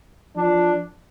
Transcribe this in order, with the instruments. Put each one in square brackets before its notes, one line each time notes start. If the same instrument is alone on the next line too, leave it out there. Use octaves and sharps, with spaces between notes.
[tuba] F3 [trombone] D4